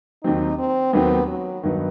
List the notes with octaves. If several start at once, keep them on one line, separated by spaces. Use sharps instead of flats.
D#2 D#3 F#3 C4 D#4
C4
D#2 D#3 F#3 B3 C4
F#3
G2 D#3 F#3 B3 D#4